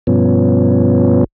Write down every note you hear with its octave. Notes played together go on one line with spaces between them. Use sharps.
G2 B2 F3 B3 C#4